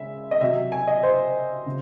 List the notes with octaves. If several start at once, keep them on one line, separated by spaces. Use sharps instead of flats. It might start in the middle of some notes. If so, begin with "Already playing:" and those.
Already playing: C#3 G#3 E5
D#5
C3 F#3 E5
G#5
D#5
C5
C#3